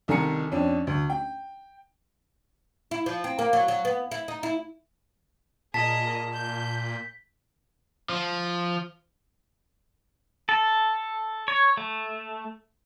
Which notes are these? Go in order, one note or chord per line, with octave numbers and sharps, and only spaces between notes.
C2 D#3 A4 G#5 A#5 C#7
F2 C#4 D4
D2
G5
E4
F3
C4
A#3
F#3
F#3
B3
E4
D#4
E4
A#2 G#4 A#4 D#5 A5 B6
G6
F3
A4
C#5
A3